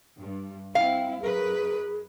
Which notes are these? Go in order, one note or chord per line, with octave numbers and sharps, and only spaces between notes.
G2
C4 E4 F5 G5
F#2 G#4 A#4 B4